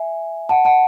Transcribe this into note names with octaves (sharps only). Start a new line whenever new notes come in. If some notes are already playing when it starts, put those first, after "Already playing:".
Already playing: E5 G#5
F#5 A5
F#5 A5